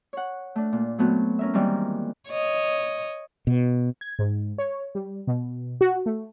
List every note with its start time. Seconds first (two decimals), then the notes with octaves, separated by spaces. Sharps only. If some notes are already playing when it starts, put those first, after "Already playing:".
0.13 C#5 F#5
0.56 A3 D4
0.73 A#2
0.98 F#3 A3 B3 C4 F#4
1.39 C#4 A#4 E5
1.54 D#3 E3 G3 G#3 A#3 C4
2.30 C#5 D#5
3.47 B2
4.01 G#6
4.19 G#2
4.58 C#5
4.95 G3
5.27 B2
5.81 F#4
6.06 A3